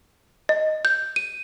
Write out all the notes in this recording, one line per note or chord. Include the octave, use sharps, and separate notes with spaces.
D#5
G6
D#7